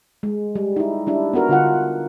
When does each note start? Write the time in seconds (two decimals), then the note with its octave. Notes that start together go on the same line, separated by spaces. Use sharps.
0.23 G#3
0.55 G3
0.76 D#4 E4
1.07 G3 D4 E4
1.33 B3 D4 F#4 A#4
1.49 D3 F4 F#5